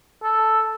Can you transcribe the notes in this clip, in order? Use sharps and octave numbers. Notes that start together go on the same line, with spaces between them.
A4